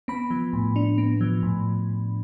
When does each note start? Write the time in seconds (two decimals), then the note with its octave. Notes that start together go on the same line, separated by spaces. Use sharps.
0.08 B3 B5
0.30 F3
0.53 A2
0.76 D4
0.98 B3
1.21 F3
1.43 A2